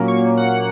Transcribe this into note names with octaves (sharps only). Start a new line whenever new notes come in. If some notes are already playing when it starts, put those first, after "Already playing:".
Already playing: A#2 F#3 A#3 C#4
C#6
F#5